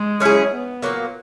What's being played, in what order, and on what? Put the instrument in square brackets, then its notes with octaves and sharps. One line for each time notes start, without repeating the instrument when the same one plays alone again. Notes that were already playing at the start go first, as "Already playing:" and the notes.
Already playing: [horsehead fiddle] G#3
[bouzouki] F#3 C#4 E4 G#4
[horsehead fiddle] B3
[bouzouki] A#2 F#3 A#3